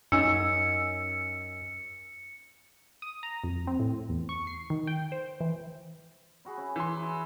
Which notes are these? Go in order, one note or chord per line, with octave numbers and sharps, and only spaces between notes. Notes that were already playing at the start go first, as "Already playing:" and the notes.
F#2 C#4 D#4 G#5 E6 C#7
D#6
A#5
F2
C4
A2
E2
C#6
C7
D#3
G5
C5
E3
E4 F#4 G#4
C#4 E4
E3 C6
B4 E5